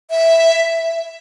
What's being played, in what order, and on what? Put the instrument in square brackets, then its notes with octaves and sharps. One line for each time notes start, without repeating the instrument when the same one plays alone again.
[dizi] E5